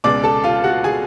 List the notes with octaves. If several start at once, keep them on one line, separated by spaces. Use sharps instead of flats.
C#2 B2 G#3 D5 D6
A4 A5
F4 F5
F#4 F#5
G#4 G#5